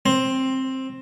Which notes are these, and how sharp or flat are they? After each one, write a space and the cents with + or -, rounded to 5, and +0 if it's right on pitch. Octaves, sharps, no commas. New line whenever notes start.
C4 +10